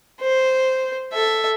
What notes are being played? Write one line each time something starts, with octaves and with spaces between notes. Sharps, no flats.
C5
A4 E5